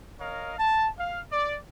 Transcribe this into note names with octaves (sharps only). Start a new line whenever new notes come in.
A#4 C#5 D#5 F5
A5
F5
D5